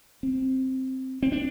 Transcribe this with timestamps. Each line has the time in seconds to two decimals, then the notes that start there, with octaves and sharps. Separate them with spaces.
0.23 C4
1.23 C4
1.32 D4